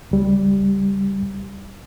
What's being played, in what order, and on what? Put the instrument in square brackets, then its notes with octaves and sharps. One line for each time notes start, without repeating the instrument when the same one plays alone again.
[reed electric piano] C#2 G3